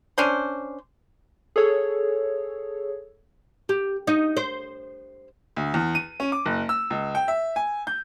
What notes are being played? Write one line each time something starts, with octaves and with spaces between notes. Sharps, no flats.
C#4 D4 C5
G#4 A4 C#5
G4
D#4
C5
D2
E2
D#7
C#4
D6
F#1
E6
C#2
G5
E5
G#5
G6